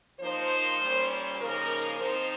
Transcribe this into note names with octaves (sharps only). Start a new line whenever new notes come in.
F3 A#3 D#4 C5
A#2 G3 C#4
C#3 F3 A#3 D#4 A#4
F3 C4 D#4 C5